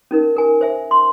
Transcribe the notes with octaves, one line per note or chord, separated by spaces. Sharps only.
C#4 D#4 A#4
A#4 G#5
C5 E5 G#5
C6